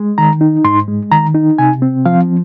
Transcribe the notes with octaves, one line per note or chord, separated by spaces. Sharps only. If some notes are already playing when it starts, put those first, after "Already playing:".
Already playing: G#3
D#3 A#5
D#4
G#2 C6
G#3
D#3 A#5
D#4
C3 G#5
C4
F3 F5